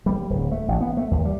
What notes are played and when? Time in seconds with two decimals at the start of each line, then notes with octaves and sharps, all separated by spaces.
0.06 G3
0.30 D1
0.51 A3
0.68 A1
0.81 B3
0.97 A3
1.11 D#2
1.25 G3